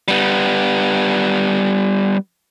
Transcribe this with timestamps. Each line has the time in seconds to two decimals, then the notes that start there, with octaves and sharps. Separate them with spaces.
0.08 G3 B3